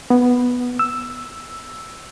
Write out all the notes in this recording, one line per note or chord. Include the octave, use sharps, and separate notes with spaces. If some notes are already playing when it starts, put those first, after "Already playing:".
B3
E6